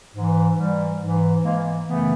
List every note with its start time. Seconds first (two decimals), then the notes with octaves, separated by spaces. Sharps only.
0.15 G#2 E3
0.57 G#2 E3 G3
1.01 G#2 E3
1.44 G#2 E3 G#3 A#3
1.86 F#2 C#3 E3 A3 B3